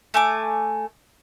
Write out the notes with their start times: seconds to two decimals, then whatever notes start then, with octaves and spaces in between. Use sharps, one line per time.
0.14 A3 G#5 D6